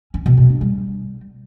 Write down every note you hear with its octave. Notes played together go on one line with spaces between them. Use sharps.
C#4
B2
B2
D4
G3